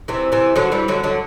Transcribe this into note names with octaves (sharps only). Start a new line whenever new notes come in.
C3 E3
C3 E3
D3 F#3
E3 G3
D3 F#3
D3 F#3